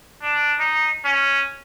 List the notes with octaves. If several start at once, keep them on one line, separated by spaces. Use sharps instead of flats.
D4
D#4
C#4